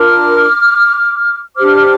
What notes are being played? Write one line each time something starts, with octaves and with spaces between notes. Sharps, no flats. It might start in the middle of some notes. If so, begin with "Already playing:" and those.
Already playing: D4 F4 A#4 D6 F6
D4 G4 C5 D6 F6